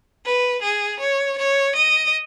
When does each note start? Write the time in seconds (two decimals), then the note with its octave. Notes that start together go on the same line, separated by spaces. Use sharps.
0.25 B4
0.63 G#4
1.00 C#5
1.38 C#5
1.76 D#5